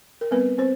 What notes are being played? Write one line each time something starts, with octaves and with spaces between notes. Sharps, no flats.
A#4
G3 B3 C4 B4
C4 C5